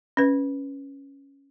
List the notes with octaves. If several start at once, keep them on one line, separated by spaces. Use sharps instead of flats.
C#4 B4